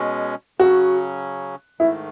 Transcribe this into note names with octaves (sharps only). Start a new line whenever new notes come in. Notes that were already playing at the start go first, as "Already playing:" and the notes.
Already playing: B2 G#3 C#4
C#3 F#3 C#4 F#4
G#2 D#3 A3 E4